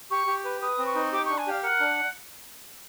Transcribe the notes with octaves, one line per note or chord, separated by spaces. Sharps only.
G4 C#6
G4
B4
B4 D#6
C4
C#6
D#4
G4 D6
D4 C#6
G#5
G4 F5
A#4 F#5
D4